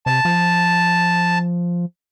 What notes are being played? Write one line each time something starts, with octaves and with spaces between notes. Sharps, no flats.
C3 A5
F3